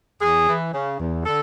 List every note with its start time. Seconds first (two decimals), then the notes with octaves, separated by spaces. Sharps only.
0.21 E2 G#4
0.47 E3
0.73 C#3
1.00 E2
1.26 D3 A4